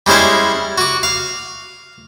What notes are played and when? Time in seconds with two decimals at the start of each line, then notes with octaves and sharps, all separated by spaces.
0.06 G3 G#3 C#4 E4 C5
0.78 F#4 D6
1.03 F5